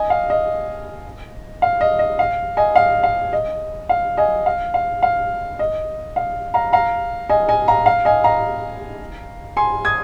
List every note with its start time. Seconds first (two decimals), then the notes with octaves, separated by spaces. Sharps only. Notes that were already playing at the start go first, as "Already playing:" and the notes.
Already playing: D#5 G#5
0.10 F5
0.30 D#5
1.62 F5
1.81 D#5
1.99 D#5
2.19 F5
2.57 D#5 G#5
2.75 F5
3.03 F5
3.33 D#5
3.89 F5
4.17 D#5 G#5
4.46 F5
4.74 F5
5.03 F5
5.59 D#5
6.16 F5
6.54 F5 A#5
6.73 F5 A#5
7.29 D#5 G#5
7.49 D#5 G#5
7.68 F5 A#5
7.86 F5
8.05 D#5 G#5
8.24 F5 A#5
9.57 G#5 C6
9.85 D#6 G#6